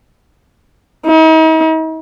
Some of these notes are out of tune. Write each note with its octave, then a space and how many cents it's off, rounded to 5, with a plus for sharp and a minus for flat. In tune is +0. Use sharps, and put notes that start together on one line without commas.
D#4 +45